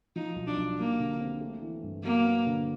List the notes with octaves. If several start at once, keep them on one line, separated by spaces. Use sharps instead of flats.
F3 D#4
B1
D4
B1
G3 A#3
D3
C4
A3
E3
G2
F#3 A#3
B3
D3